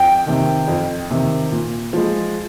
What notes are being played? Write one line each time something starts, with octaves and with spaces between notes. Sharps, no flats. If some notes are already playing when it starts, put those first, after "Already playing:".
Already playing: F2 G5
C3 D#3
F2
C3 D#3
A#2
F3 G#3